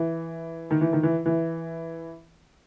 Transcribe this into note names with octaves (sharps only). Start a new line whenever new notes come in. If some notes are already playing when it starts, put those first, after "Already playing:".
Already playing: E3
D#3
E3
D#3
E3
E3